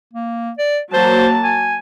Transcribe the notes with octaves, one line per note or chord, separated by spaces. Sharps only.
A#3
D5
F#3 A#3 C5 A5
G#5